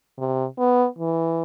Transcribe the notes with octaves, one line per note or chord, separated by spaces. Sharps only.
C3
B3
E3